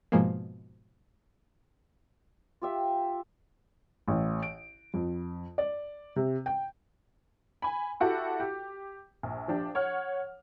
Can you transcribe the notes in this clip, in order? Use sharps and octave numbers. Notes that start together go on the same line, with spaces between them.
G#2 B2 F3 G#3 A#3
F4 G4 E5
A1
D7
F2
D5
C3
G5
G#5 B5
E4 F#4 G4 A4
G4
A#1
F3 D4 G4
C#5 F#5 F6